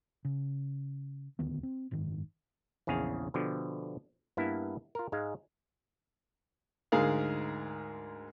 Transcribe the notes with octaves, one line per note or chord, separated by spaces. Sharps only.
C#3
D#1 D2 D#3 B3
C4
F#1 G#2 D#3
A#1 E2 C#3 G#4 F5
B2 D3 F3 G4
G2 A#3 B3 E4
F4 A#4
G#2 G#3 F5
D2 G#2 G#4 A#4 F5